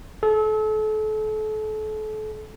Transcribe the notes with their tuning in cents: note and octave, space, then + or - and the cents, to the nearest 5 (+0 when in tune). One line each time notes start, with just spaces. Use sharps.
A4 -35